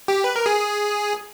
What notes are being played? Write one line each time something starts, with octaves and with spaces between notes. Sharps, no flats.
G4
B4
A#4
G#4